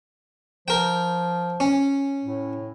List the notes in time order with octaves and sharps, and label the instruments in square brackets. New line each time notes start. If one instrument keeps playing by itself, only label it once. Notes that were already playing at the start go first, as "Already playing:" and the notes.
[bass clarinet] F3 [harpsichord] A#4 G5
[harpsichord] C#4
[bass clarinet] A2